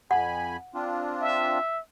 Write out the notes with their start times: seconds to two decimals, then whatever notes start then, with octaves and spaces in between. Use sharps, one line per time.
0.11 F2 F#5 G#5 B5
0.74 C4 D4 F4
1.22 E5